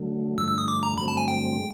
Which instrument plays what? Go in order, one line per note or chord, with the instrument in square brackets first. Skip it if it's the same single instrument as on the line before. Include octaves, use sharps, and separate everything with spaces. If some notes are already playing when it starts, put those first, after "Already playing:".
Already playing: [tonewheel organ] D3 F#3 A3
[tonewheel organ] G2 D3 F3 A3 [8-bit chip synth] E6
[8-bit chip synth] E6
D#6
D6
A#5
[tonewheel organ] G2 D3 F#3 A3 C4 [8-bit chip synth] B5
[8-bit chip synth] A5
G#5
G5
[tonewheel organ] G#3